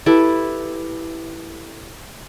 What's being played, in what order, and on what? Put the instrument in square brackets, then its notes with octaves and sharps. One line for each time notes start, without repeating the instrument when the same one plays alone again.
[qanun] E4 G4 A4 B4